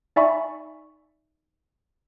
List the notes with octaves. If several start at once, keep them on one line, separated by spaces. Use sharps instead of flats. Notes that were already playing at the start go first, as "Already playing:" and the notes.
D#4 D5 E5 G#5 B5 C#6